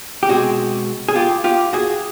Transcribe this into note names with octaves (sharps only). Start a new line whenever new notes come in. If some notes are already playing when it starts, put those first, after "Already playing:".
G4
B2 G#3 C4 F#4 G#4
G#4
F4 G4
F4 G4
F#4 G#4